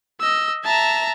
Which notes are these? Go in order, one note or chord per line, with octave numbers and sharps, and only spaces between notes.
D#5 E6
E5 A5 A#5